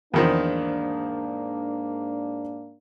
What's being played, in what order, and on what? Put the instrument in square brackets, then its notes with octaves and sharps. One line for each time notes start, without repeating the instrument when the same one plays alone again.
[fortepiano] E2 D#3 F3 [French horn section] G#2 A#3 D4